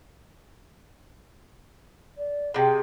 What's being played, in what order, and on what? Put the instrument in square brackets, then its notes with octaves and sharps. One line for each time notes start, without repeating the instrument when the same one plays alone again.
[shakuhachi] D5
[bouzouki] C3 G#3 [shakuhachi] G5